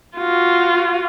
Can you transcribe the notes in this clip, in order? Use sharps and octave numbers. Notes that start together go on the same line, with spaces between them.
F4 F#4